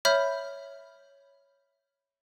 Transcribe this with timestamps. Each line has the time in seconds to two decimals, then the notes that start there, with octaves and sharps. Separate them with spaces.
0.05 C#5 E5 B5 F6 G6